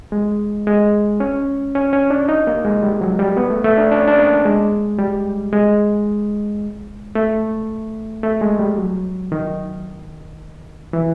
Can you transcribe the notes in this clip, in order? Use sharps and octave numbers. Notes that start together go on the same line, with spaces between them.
G#3
G#3
C#4
C#4
C#4
D4
D#4
A#3
G#3
G3
F#3
G3
B3
A3
A3
D4
D4
C#4
D4
A#3
G#3
G3
G#3
A3
A3
G#3
G3
F#3
D#3
E3